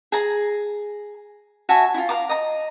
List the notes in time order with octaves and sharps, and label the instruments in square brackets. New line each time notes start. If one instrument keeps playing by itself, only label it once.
[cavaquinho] G#4 A#5
F#4 E5 G#5 A5
E4 F4
F5 A#5 D6
D#5 A#5